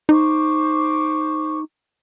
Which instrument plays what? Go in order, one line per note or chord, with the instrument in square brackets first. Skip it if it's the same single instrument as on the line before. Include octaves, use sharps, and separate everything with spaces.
[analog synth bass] D#4 [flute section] C5 C#6 D6